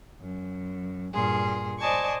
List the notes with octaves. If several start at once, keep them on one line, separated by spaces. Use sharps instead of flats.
F#2
G2 A#2 G#4 C6
C5 D5 D#5 G#5 A5 C#6